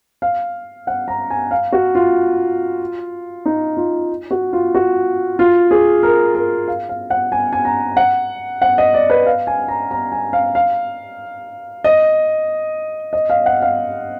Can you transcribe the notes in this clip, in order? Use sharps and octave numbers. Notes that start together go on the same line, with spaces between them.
F5
F#5
A#5
G#5
F5
F#4
F4
D#4
F4
F#4
F4
F#4
F4
G#4
A#4
A#4
F5
F5
F#5
G#5
G#5
A#5
F#5
F#5
D#5
D5
B4
F5
G#5
A#5
A#5
G#5
F5
F5
D#5
D#5
F5
F#5
F5